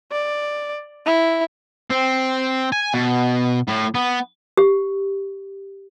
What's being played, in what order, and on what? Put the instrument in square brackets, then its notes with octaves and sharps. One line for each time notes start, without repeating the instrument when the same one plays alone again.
[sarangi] D5
E4
[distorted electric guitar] C4
G#5
B2
A2
B3
[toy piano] G4